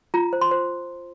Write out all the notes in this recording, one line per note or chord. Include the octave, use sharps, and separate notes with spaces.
F4 A#5
C5
C6
C5